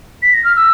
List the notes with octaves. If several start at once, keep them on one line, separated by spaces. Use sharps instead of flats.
B6
A#6
F6
E6